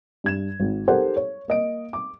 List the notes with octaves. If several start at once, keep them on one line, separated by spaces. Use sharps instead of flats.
G2 G#6 E7
G#1
D#4 G4 A4 A#4 C5 F#5
C#5
A#3 D#5 D7
D6